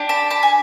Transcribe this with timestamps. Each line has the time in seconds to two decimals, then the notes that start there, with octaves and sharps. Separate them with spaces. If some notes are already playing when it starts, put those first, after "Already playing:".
Already playing: D4 G4
0.09 A5 B5
0.30 A5 B5
0.43 G#5